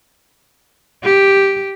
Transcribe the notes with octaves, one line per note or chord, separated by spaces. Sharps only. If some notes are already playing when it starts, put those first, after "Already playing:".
G4